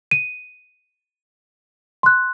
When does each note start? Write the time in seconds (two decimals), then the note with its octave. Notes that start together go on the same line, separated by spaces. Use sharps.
0.11 D#7
2.03 C6 F#6